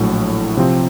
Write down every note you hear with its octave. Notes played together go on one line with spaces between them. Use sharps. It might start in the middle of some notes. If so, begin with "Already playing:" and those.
Already playing: A#1 A2 F#3 A3
C3 F3 C4